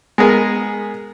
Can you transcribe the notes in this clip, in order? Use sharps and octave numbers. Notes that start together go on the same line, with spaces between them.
G#3 B3 G#4 A#4